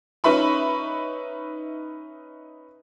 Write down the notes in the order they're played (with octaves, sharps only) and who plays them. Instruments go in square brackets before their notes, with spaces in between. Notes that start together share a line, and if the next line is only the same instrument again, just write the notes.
[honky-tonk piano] C#4 D#4 B4 E5 B5 C#6